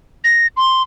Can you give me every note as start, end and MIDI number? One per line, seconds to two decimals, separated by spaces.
0.24 0.47 94
0.57 0.82 84